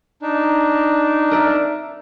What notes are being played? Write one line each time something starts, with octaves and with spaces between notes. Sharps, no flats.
D4 D#4
A#4 D5 E5